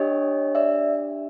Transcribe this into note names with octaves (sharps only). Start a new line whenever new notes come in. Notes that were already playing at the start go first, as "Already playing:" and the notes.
Already playing: D4 G4 C#5 D#5
D5 E5